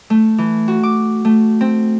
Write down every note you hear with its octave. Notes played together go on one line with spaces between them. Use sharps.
A3
E3
F#4
D6
A3
C4